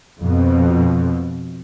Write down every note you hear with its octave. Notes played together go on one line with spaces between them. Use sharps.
F2 B2